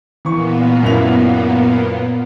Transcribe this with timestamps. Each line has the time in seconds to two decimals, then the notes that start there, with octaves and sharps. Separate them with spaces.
0.25 A#2 E3 A#3 B3 C#6
0.83 F#2 E4 F7